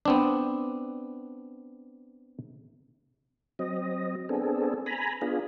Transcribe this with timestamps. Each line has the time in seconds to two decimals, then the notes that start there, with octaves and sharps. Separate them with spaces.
0.05 B3 C4 D4
3.59 F#3 C4 D#5
4.29 B3 C4 D4 G#4 A4
4.86 G#5 A#5 B5
5.22 B3 D4 F4 G#4